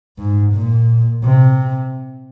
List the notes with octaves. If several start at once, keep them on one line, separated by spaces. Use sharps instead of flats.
G#2
A#2
C3